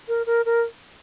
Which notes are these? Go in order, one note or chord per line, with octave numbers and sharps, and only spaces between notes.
A#4
A#4
A#4